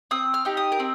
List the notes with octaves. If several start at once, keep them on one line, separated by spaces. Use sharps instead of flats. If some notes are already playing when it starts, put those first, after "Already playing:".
C4 D#6
F6
D#4 G4
D#6
A#4
C4